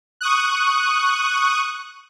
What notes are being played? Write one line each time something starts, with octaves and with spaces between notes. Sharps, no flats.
C#6 D#6 F#6